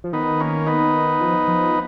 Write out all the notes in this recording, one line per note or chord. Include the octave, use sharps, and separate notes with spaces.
F3
D#3 B3 D#4
A#3 C#4
B3 D#4
F3
F3